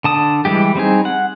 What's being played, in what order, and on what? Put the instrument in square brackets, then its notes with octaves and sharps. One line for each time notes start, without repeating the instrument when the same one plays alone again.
[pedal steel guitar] D3 A5 D#6
E3 G3 G#3 G4
G3 C4 D#4 G#4
F#5